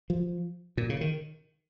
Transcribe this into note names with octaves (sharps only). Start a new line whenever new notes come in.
F3
A#2
C#3
D#3